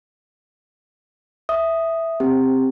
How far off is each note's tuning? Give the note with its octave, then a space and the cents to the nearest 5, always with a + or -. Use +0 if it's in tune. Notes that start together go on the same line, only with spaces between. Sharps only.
E5 +0 D#6 -5
C4 +0 G4 +20